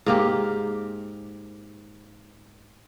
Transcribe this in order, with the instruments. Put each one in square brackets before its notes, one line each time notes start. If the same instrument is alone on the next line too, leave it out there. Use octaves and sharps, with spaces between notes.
[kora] G#2 A#3 G4